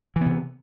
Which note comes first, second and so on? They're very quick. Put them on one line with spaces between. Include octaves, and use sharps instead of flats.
E3 B3 C3